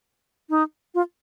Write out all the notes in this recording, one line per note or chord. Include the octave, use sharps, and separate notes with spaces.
D#4
F4